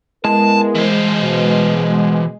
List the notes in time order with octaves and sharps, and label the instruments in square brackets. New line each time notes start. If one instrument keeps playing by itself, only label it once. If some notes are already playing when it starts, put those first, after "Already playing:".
[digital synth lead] G#3 [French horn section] B3 E4 A#4 [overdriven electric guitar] A5
[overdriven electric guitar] E3 C5
[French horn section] B2